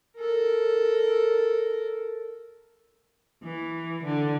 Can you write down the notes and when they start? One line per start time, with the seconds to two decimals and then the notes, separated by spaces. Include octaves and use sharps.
0.16 A4 A#4
3.43 E3
4.04 D3